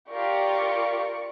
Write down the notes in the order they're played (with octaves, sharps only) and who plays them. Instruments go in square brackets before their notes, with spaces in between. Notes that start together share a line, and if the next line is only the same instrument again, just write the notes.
[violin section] F4 G4 A#4 [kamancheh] D5 C#6